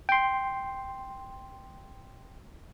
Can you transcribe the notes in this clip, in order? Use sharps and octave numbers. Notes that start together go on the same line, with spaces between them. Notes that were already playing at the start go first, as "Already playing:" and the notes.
G5 C6